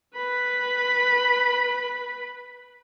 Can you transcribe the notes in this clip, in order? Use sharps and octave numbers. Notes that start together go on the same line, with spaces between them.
B4 B5